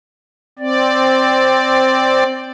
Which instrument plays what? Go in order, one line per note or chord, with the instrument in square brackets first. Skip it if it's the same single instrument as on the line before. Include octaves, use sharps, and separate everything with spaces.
[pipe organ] C4 D5